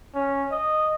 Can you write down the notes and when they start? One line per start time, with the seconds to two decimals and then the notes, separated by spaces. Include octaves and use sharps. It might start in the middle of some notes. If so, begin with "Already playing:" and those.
0.15 C#4
0.52 D#5